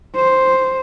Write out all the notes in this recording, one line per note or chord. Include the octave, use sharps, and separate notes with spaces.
C5